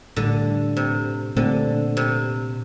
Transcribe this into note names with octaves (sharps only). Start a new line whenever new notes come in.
A2 D3 G3 D4
C3
A#2 D3 A3 C4
C3